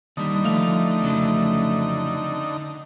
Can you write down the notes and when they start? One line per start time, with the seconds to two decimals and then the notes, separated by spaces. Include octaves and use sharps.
0.17 D#2 D3 G3 D#4
0.44 F3 A3 F5
1.02 F2 C#3 F#3